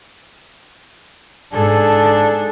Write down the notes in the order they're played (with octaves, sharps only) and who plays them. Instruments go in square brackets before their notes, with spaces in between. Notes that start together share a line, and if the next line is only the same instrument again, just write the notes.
[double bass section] G#2 [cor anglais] D4 [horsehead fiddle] G#4 A4